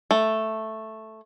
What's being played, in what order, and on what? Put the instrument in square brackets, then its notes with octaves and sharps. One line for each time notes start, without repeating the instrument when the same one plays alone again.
[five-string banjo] A3